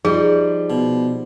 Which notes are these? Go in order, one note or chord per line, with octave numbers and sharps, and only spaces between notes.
F3 G3 D#4 G#4
B2